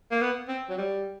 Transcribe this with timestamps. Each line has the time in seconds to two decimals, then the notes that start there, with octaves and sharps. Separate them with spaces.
0.11 A#3
0.21 B3
0.49 C4
0.69 F#3
0.78 G3